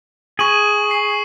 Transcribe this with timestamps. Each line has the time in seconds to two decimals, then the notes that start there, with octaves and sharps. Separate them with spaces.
0.39 G#4 C#6 D#7 F#7
0.91 C7